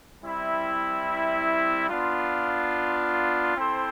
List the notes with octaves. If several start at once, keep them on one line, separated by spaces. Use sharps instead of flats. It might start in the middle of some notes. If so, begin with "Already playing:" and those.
G3 C4 E4
B3 D4 F4
C4 E4 A4 C5 E5